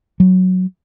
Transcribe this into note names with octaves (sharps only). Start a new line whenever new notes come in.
F#3